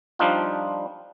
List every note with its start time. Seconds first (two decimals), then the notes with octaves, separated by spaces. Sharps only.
0.19 F3 G3 D4 D#4 F4